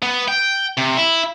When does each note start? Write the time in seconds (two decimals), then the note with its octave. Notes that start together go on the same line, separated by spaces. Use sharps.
0.03 B3
0.28 G5
0.78 C3
0.97 E4